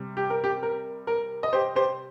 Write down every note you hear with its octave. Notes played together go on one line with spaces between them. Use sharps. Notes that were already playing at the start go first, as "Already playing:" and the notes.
Already playing: C3 G3
G4
A#4
G4
A#4
A#4
D#5
G4 C5
G4 C5